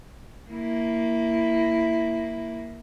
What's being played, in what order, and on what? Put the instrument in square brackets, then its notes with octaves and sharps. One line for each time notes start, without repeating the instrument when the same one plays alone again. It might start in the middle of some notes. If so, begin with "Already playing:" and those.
[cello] A#3 E4